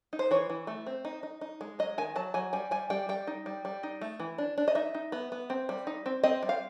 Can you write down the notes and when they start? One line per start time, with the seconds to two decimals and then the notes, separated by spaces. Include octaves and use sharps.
0.13 D#4
0.19 C5
0.31 E3 C#5
0.50 E3
0.67 A3
0.86 C4
1.05 D#4
1.23 D#4
1.41 D#4
1.61 G#3
1.79 F#3 D#5
1.98 D#3 G#5
2.16 F#3 A5
2.34 F#3 G#5
2.53 G3 G#5
2.71 G3 G#5
2.90 G3 G5
3.09 G3 G5
3.27 D#4
3.46 G3
3.65 G3
3.83 D#4
4.01 A3
4.20 E3
4.38 D4
4.58 D4
4.68 D#5
4.75 D#4 E5
4.95 D#4
5.12 B3
5.32 B3
5.50 C4
5.69 G3
5.87 D#4
6.06 C4
6.23 C4 D#5
6.43 G3
6.49 F5